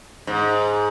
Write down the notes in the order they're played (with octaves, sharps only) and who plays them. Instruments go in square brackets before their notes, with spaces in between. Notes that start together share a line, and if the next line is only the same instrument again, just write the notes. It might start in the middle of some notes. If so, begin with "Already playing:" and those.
[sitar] G#2